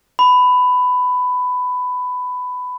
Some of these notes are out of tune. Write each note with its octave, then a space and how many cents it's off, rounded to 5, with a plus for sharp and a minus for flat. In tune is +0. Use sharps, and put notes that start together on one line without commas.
B5 +15